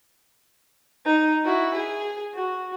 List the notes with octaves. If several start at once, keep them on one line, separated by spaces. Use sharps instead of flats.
D#4
E4 F#4
G#4
F#4